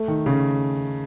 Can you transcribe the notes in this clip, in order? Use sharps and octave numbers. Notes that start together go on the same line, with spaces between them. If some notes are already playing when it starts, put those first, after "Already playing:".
Already playing: A3
D#3
C#3